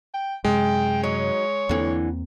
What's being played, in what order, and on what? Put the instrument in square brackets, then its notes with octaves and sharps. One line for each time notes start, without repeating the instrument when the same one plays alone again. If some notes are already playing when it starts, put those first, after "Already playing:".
[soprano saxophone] G5
[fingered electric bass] F#2 C3 [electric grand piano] G#3 [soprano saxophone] G5
[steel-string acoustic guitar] F#3 D#4 [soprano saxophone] C#5
[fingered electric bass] E2 A#3 C4 [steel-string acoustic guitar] D3 E3